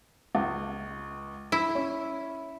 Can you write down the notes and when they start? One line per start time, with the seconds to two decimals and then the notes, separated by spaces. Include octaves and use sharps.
0.35 C#2
1.52 E4
1.75 C#4